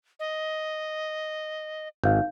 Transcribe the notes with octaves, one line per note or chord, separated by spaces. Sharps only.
D#5
G#1 D#4 F5 G6